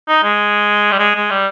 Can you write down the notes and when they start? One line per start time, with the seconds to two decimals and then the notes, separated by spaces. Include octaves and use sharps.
0.08 D#4
0.24 G#3
0.92 G3
0.99 G#3
1.15 G#3
1.30 G3